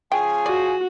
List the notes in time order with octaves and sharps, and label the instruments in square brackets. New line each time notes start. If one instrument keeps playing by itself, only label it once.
[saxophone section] F3 C#4 G#4 [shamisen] G5 [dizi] G#5
[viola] F#4 [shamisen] D5